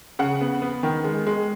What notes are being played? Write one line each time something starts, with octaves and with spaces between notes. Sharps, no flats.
C#3 F#5
B3
B3
D#3
G#3
G#3